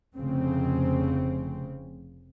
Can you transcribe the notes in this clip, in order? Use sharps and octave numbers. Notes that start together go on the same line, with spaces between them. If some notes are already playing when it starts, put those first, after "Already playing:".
F1 C#3 C4